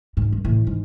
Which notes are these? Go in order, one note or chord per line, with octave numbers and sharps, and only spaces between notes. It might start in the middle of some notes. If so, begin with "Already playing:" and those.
G#2
G2
A2 E3
G#2